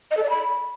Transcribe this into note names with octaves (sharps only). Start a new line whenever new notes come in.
D#5
A4
D5
B5